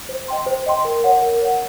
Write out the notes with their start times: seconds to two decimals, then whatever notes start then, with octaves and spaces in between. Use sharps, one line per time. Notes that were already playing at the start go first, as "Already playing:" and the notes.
0.09 C5
0.28 D#5 G5 C6
0.46 C5
0.66 D#5 G5 C6
0.85 A#4
1.04 C#5 F#5
1.22 A#4
1.41 C#5 F#5